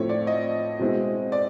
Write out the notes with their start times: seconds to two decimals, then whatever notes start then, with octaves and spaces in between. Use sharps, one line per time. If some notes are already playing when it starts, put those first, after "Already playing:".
Already playing: A2 F3 A3 C4 E4 C#5
0.09 D5
0.27 D#5
0.79 B2 G#3 C4 E4
1.32 D5